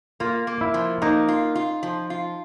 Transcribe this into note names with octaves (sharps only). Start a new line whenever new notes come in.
A#3 F4
A#3
E4
F3
A#3 D#4
F4
F4
F3
F4